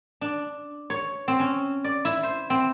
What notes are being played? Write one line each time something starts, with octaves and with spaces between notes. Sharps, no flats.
D4
C#5
C4
C#4
D5
E4
C5
C4